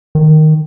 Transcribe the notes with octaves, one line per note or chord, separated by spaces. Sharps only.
D#3